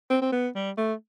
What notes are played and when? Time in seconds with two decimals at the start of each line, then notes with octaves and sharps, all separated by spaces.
0.10 C4
0.22 C4
0.32 B3
0.55 G3
0.77 A3